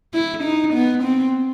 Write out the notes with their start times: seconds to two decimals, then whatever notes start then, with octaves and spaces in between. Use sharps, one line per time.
0.13 E4
0.43 D#4
0.73 B3
1.03 C4